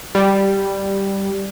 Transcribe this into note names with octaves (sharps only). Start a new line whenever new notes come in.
G3